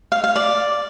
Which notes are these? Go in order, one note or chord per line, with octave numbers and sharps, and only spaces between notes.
F5
F5
D5